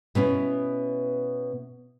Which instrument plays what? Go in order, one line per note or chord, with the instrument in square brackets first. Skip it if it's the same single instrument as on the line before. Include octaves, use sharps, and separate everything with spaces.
[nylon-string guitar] B2 B3 C#4 E4